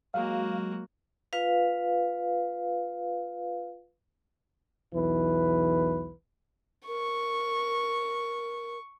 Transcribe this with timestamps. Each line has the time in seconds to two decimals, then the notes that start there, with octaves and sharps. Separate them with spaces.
0.14 F#3 G#3 A#3 F#4 F5
1.33 F4 B4 F5
4.94 B1 E2 E3 B4
6.88 A#4 C#6